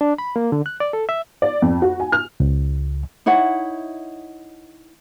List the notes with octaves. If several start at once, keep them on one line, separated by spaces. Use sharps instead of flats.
D4
B5
A#3
D3
F#6
D5
A4
E5
D5
F2
F#4
G#5
F6
C#2
D#4 E4 C#5 F#5